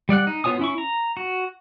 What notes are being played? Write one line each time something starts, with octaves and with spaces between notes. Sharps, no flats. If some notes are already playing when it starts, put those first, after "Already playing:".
G3 D5 F#5 F#6
D#4
B3 F4 C#5 G#5 D#6
C#4 E4 C#6
A#5
F#4